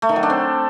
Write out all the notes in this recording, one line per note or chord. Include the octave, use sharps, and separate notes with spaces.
A3
D#3
F#3
D4
C4